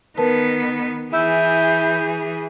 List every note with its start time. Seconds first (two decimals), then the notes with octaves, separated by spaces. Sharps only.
0.18 D#3 B3 A#4 B4 A5
1.13 E3 E4 G#4 E6 G6